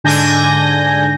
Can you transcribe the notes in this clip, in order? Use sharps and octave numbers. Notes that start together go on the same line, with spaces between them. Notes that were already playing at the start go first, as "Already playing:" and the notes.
G#2 D3 D4 G#5 G6 A#6